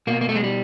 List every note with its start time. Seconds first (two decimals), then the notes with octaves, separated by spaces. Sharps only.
0.07 B2 A#3
0.21 A#3
0.29 A3
0.36 G#3
0.44 G3